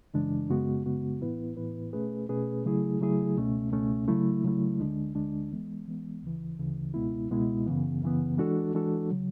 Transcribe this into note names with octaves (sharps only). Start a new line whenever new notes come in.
F#2 C#3 E3 G#3 D4
F#2 C#3 G#3 B3 F#4
F#2 C#3 G#3 B3 F#4
A2 E3 B3 E4 B4
A2 E3 B3 E4 B4
B2 A3 C#4 G#4 B4
B2 A3 C#4 G#4 B4
C#3 F#3 A3 E4 G#4
C#3 F#3 A3 E4 G#4
C#2 B2 A3 C#4
C#2 B2 A3 C#4
C#3 F#3 A3 E4
C#3 F#3 A3 E4
D2 D3 G#3 D4
D2 D3 G#3 D4
E3 G#3 B3
E3 G#3 B3
D2 C#3 E3
D2 C#3 E3
C#2 B2 G#3 B3 E4
C#2 B2 G#3 B3 E4
F#2 C#3 E3 B3
F#2 C#3 E3 B3
E3 G#3 D4 F#4 A4
E3 G#3 D4 F#4 A4
C#3 F#3